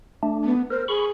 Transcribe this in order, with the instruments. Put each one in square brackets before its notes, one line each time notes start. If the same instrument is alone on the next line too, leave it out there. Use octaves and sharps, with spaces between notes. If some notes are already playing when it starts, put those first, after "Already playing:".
[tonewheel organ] A3 D4
[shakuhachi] B3
[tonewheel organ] A#4 [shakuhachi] C5
[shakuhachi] G#4 [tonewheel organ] B5 C#6